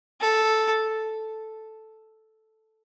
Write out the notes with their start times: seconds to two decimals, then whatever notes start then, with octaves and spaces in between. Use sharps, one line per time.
0.20 A4